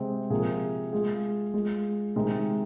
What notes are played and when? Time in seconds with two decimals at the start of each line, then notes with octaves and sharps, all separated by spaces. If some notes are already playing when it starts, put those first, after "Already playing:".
Already playing: C3 G#3 C4
0.30 C3 F3 A#3 G#4
0.93 G#3 F4 G#4
1.54 G#3 F4 G#4
2.16 C3 D#3 G#3 D#4